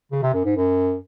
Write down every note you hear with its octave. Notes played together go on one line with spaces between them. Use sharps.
C#3
C3
F#2
G#2
F#2